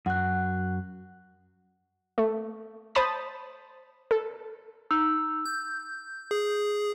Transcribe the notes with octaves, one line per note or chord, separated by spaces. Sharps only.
F#2 F#4 F#5 F#6
A3
C5 A5 B5 D#6 A6
A4
D#4 E6
G6
G#4